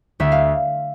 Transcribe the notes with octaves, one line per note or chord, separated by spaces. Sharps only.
D2 E5
F5